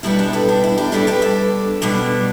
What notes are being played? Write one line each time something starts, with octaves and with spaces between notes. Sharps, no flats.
B2 G3 B3 D4 E4
D4 G4
E4 A4
D4 G4
E4
D4 G4
B2 G3 D4 E4 A4
G4 B4
A4 D5
B2 G3 B3 D4